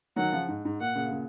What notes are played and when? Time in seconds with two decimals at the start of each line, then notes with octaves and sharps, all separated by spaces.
0.16 D#3 F#3 F#5
0.32 C#3 F3
0.48 G#2
0.65 G#2
0.80 A#2 F#5
0.95 A#2 C#3
1.11 A#2 C#3